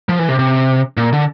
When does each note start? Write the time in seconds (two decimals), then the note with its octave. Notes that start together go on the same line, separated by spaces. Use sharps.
0.09 F3
0.19 E3
0.28 C3
0.39 C3
0.97 A#2
1.13 D3